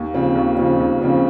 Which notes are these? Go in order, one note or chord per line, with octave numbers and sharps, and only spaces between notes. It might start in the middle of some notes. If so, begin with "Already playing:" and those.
Already playing: D#2
C#3 F3 C4
D#2
C#3 F3 C4
D#2
C#3 F3 C4